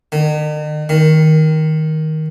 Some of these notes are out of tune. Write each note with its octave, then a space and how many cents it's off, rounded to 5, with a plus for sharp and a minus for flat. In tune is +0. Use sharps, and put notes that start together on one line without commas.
D#3 -45
D#3 +10